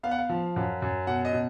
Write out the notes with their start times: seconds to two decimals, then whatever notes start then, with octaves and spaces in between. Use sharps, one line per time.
0.03 B3 F5
0.11 F#5
0.18 F5
0.29 F3
0.56 F#2
0.82 F#2
1.07 B2 F#5
1.25 D#5
1.33 B2